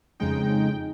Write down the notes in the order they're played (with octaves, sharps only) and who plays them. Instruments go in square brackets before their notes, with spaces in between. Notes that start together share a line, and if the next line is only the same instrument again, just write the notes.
[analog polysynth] F2 C#3 G#3 D#4 G5